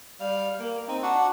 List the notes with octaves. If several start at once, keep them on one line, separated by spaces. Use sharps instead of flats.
G3 F5
A#3
C4 D#4
D4 F#4 F#5